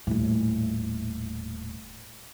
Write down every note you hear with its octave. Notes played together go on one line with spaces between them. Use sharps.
D#1 A2